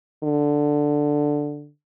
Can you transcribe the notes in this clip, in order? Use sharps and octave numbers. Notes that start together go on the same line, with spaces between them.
D3